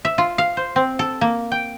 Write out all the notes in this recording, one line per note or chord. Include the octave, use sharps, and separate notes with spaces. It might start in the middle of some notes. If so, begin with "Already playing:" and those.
E5
F4
F5
C5
C4
A4
A#3
G5